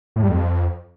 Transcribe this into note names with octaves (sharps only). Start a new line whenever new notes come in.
A2
G2
F2